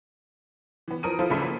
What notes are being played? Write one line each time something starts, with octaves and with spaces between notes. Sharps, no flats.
E3 B3
E3 F3 A#4 D#6 D7 D#7
F3 E4 F4 A4 C5
A1 D2 C#3 E5 C6 B6
A#3